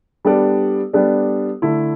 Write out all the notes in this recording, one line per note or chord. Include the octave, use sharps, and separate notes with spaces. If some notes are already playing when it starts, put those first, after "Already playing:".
G3 B3 D4 A4 D5
G3 B3 D4 A4 D5
D3 A3 E4